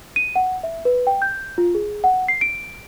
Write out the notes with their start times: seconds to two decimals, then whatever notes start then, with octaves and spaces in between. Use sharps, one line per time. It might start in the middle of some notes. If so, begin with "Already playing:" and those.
0.16 D#7
0.36 F#5
0.63 E5
0.85 B4
1.07 G5
1.22 G6
1.58 F4
1.75 G#4
2.04 F#5
2.28 C7
2.41 D7